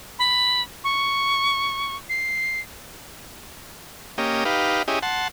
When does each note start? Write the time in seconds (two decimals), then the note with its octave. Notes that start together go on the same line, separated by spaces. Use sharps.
0.19 B5
0.84 C#6
2.09 C7
4.18 A#3 C#4 G4 D#5
4.45 D#4 G4 B4 F5
4.88 C#4 E4 G4 G#4 D#5
5.03 F#5 A5 C6